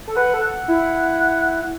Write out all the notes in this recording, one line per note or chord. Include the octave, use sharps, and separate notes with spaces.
A4
B4 F#5
A4
F#5
E4